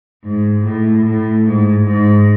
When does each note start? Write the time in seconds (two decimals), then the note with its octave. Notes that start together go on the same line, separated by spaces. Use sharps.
0.24 G#2
0.65 A2
1.05 A2
1.46 G#2
1.87 G#2